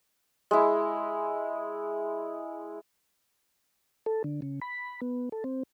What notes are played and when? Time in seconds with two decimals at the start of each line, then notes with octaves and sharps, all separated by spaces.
0.51 G#3 E4
4.06 A4
4.24 D3
4.42 C#3
4.62 B5
5.01 B3
5.32 A4
5.44 C4